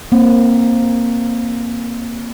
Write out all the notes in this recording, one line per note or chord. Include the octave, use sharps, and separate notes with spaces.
A#3 C4